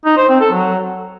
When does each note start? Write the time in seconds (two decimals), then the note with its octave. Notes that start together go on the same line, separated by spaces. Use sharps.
0.05 D#4
0.17 C5
0.29 C4
0.40 A4
0.52 F#3